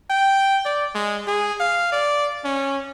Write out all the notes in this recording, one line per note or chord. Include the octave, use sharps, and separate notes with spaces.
G5
D5
G#3
G#4
F5
D5
C#4